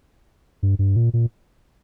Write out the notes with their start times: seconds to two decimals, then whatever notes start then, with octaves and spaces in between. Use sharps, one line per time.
0.63 G2
0.79 G2
0.96 A#2
1.13 A#2